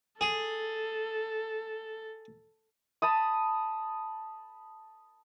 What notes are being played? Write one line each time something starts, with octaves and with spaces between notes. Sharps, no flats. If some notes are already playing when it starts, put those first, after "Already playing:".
G#4 A4
A5 B5 D#6